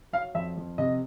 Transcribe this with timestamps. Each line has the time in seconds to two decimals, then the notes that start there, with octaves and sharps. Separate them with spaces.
0.13 F#3 F5
0.35 F2 E5
0.57 F2
0.78 C3 D#5